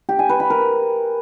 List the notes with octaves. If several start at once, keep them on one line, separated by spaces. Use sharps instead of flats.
G4
G#5
B4
B5
A#4